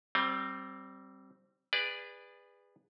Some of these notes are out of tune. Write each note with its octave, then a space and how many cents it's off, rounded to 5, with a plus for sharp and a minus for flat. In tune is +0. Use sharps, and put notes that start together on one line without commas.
G3 -20 C4 +10
G#4 -30 B4 +0 D5 +0